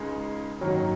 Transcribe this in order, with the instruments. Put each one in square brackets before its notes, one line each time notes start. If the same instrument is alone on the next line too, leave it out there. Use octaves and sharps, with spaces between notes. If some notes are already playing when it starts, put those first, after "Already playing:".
Already playing: [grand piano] C#2 C#3 G#3 D#4 G#4
[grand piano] G#1 F#2 D#3 A#3 D#4 [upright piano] F#3